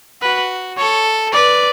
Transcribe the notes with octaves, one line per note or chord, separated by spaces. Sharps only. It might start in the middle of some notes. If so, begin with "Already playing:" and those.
F#4 B4
A4 C#5
B4 D5